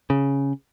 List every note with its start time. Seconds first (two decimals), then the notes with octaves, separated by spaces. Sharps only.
0.10 C#3